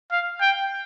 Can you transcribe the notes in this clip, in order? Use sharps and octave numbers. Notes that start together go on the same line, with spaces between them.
F5
G5